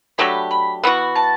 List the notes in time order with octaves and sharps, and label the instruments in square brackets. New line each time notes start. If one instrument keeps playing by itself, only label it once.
[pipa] F#3 A3 D4 G4 [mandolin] B5
[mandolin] B5
[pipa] E3 B3 F#4 [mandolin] F#5
[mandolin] A5